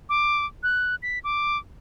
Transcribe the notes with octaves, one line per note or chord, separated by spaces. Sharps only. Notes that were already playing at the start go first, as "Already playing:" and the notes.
D6
F#6
B6
D6